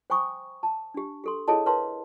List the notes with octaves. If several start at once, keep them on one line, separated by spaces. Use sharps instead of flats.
C5 G5 G#5 A#5 C#6 D#6
A5
D4 G4
G4 A4 C6
E4 G#4 A4 C#5 D#5 A5
A#4 B4 C#5 F5 A5 C6